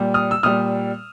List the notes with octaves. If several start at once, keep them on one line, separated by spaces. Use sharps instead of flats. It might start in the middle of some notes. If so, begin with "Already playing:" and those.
Already playing: A#2 G3
D#6 F6
E6
A#2 G3 D#6 F6